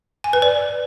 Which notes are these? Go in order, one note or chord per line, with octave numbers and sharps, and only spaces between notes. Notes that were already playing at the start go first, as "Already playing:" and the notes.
G#5
B4
D5